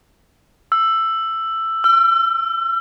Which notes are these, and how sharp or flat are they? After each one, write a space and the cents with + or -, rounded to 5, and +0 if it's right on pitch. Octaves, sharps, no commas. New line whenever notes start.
E6 +10
E6 +45